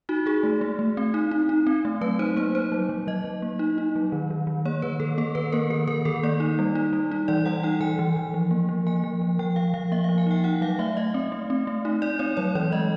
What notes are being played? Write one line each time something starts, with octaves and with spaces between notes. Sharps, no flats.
D#4 F#4
D#4 G#4
A3
A3
A3
C4
D#4
D#4
D#4
C4
A3
F#3 B4
D#4 C5
A#3 C5
D#4 C5
F#3
F#3
F#3 D#5
F#3
A#3
D#4
D#4
F#3
D#3
D#3
D#3
A#3 C#5
D#3 B4
D#3 A4
A#3 A4
D#3 B4
A#3 A#4
D#3 A#4
D#3 A#4
D#3 A4
A#3 D5
D#4
G3
D#4
G3
D#4
E3 D5
G3 F#5
D#4 G5
E3 G#5
E3
E3
F3
A#3
F3
A#3 G#5
F3
F3
F3 G5
F3 F5
F3 F5
A#3 E5
F5
F3
G#5
D#4 G5
D#4 F#5
F#3 F5
A3 E5
A3 D#5
C4
A3
C4
A3
D#4
D#4 D5
C4 C#5
F#3 C#5
E3 D5
G#3 D#5